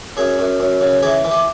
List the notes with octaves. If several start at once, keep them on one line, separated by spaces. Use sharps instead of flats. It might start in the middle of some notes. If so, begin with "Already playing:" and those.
F#2 G#4
F#2
F#2
C#3
E3 G#4
E3
G4